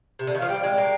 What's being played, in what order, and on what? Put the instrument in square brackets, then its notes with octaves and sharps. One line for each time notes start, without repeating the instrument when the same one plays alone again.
[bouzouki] C3
D3
D#3
[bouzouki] F3 [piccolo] F5
[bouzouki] G3 [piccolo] G5
[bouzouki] G#3
A#3